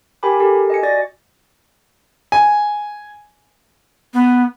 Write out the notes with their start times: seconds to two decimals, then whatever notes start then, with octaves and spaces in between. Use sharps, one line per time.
0.23 G4 A#4 G5 G#5 B5 D6
0.40 G4 A4 A#4
0.70 D#5 G#5 C#7
0.83 F#4 D5 A6 A#6
2.32 G#5
4.14 B3